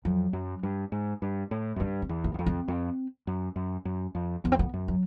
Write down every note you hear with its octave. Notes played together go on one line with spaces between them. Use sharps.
F2 F#3
F#2
G2
G#2
G2
A2
F#2
G2 C4
C4
E2
A#3
E2
F2
C4
F2
F#2
F#2
F#2
F2
F2 B3
C4
B3
F#2
F#3